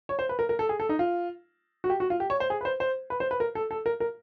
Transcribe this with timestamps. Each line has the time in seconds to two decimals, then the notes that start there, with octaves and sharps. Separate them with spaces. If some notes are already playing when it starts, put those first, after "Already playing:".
0.09 C#5
0.19 C5
0.29 B4
0.39 A#4
0.49 A#4
0.59 A4
0.69 G#4
0.80 A4
0.89 D#4
0.99 F4
1.84 F#4
1.90 G4
2.00 F#4
2.10 F4
2.20 G4
2.30 C#5
2.40 C5
2.50 G#4
2.61 B4
2.65 C5
2.80 C5
3.10 B4
3.20 C5
3.31 B4
3.40 A#4
3.55 A4
3.71 A4
3.86 A#4
4.00 A#4